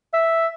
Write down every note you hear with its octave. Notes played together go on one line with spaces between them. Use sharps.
E5